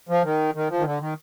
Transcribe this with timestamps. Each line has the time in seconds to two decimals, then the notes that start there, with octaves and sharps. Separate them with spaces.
0.09 F3
0.24 D#3
0.55 D#3
0.70 F3
0.79 D#3
0.85 D3
1.00 D#3